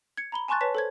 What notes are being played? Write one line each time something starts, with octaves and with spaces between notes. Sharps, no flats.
G#6 C#7
A#5 B5 G7
G#5 A5 C6 C#6 F#6 A6
B4 C#5 A5 B6
A4 C5 G#6